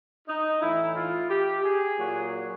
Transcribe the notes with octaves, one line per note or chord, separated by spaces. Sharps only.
D#4
A2 E3 E4
F4
G4
G#4
A#2 F#3